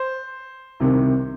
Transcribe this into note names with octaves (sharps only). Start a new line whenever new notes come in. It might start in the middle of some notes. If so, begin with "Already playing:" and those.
Already playing: C5
C2 C3 D#3